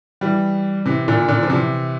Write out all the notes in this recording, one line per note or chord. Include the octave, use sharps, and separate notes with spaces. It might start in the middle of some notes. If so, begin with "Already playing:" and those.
E3 G3
C3 E3
A#2 D3
A#2 D3
F3
C3 E3